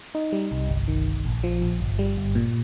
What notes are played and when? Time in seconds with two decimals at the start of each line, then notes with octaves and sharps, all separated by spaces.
0.15 D#4
0.32 G3
0.52 C2
0.69 G1
0.88 D#3
1.06 G1
1.25 A#1
1.44 F3
1.62 A#1
1.80 G1
1.99 G3
2.17 G1
2.35 A#2